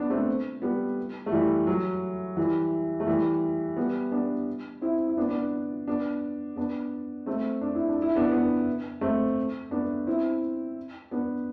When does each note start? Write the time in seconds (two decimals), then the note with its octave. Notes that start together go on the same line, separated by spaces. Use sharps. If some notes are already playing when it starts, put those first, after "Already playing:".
Already playing: B3 D4
0.10 A3 C4
0.62 G3 B3
1.26 A3
1.32 E3 G3
1.67 F#3
2.37 E3 G3
3.00 A3
3.07 E3 G3
3.77 G3 B3
4.12 B3 D4
4.82 C4 E4
5.08 E4
5.17 B3 D4
5.28 B3 D4
5.88 B3 D4
6.56 B3 D4
7.26 A3 C4
7.61 D4
7.75 E4
7.89 D4
8.02 E4
8.16 B3 D4
8.31 B3 D4
9.01 A3 C4
9.71 B3 D4
10.07 C4 E4
11.11 B3 D4